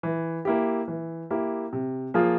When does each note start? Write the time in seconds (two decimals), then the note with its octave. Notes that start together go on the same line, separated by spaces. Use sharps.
0.03 E3
0.45 A#3 E4 G4
0.88 E3
1.31 A#3 E4 G4
1.73 C3
2.14 F3 A#3 F4 G#4